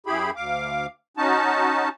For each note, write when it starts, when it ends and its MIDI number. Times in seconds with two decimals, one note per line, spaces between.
0.06 0.31 42
0.06 0.31 64
0.06 0.31 67
0.06 0.31 68
0.06 0.31 83
0.36 0.86 38
0.36 0.86 77
0.36 0.86 86
1.17 1.89 61
1.17 1.89 63
1.17 1.89 66
1.17 1.89 81